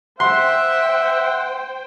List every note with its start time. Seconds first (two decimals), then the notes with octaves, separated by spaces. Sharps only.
0.20 C5 E5 F#5 G5 C6